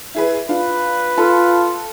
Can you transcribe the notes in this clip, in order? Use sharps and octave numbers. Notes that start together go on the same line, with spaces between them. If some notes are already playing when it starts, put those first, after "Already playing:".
E4 G#4 B4
D4 F4 B4
F4 A4